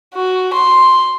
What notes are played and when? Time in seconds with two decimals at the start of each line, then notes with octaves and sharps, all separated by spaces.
0.15 F#4
0.54 C6